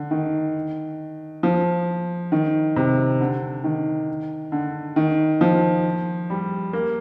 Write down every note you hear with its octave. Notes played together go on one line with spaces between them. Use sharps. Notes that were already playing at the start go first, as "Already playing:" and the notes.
Already playing: D3
D#3
F3
D#3
C3
D3
D#3
D3
D#3
F3
G3
A#3